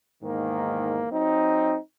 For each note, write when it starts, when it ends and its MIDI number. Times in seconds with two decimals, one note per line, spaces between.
0.23 1.07 40
0.23 1.07 44
0.23 1.07 51
0.23 1.07 58
1.11 1.77 54
1.11 1.77 60
1.11 1.77 63